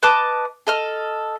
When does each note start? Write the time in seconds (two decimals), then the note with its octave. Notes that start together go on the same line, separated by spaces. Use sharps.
0.03 B4 D#5 A5 D6
0.67 A4 D#5 F6